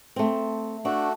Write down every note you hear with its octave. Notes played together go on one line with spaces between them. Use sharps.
A3 C4
A3 D4 F#4